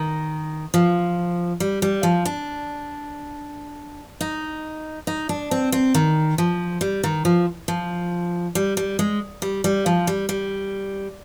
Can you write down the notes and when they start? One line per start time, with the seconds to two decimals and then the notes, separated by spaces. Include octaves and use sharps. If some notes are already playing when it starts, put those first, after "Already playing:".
Already playing: D#3
0.74 F3
1.60 G3
1.82 G3
2.03 F3
2.25 D4
4.21 D#4
5.07 D#4
5.29 D4
5.51 C4
5.72 C4
5.94 D#3
6.38 F3
6.81 G3
7.03 D#3
7.25 F3
7.68 F3
8.55 G3
8.77 G3
8.99 G#3
9.42 G3
9.64 G3
9.86 F3
10.07 G3
10.29 G3